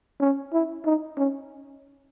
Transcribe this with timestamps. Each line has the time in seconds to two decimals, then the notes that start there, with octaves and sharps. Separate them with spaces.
0.21 C#4
0.53 E4
0.85 D#4
1.17 C#4